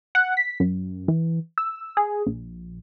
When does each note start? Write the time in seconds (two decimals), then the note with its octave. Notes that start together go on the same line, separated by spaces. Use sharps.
0.15 F#5
0.37 B6
0.60 F#2
1.08 E3
1.58 E6
1.97 G#4
2.26 A#1